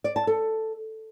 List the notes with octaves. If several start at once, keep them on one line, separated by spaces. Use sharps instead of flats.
D5
A5
A4